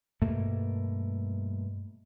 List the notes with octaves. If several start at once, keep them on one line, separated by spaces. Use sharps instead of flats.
G2 B2 A3 A#3